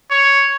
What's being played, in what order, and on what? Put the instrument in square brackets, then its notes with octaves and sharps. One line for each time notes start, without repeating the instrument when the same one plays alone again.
[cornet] C#5